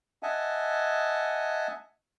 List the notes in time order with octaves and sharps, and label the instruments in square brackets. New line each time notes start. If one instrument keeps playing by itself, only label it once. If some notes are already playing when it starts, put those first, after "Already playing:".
[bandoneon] D#5 E5 F#5 G#5 A5